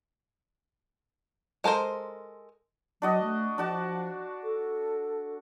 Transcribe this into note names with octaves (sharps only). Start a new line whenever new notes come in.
G#3 A4 A#4 C5
F#3 D4 F#4 D#5
A3
F3 D4 F#4 A5
A4